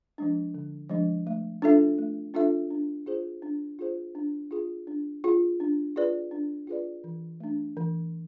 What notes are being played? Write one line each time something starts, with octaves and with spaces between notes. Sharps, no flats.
F3 G#3 D4
D3
F3 G#3 D4
A3
D4 F4 A4 E5
A3
D4 F4 A4 E5
D4
F4 G#4 C5
D4
F4 G#4 C5
D4
F4 G#4
D4
F4 G#4
D4
F4 G#4 B4 D5
D4
F4 G#4 B4 D5
E3
A3 D4
E3